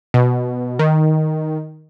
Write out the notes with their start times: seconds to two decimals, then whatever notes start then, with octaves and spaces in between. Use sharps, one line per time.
0.14 B2
0.79 D#3